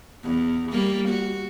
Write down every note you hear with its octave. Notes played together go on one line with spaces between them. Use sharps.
E2
G3 A#3
F#4